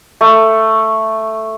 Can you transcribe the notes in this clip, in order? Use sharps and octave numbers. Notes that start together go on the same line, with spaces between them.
A3